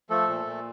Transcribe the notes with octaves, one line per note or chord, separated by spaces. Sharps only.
F3 A3 A4
A#2
A#2